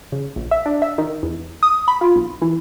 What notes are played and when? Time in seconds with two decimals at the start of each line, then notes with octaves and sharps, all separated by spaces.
0.12 C#3
0.36 A#1
0.51 E5
0.66 D4
0.82 E5
0.98 D#3
1.23 E2
1.63 D#6
1.88 B5
2.01 F4
2.16 B1
2.42 E3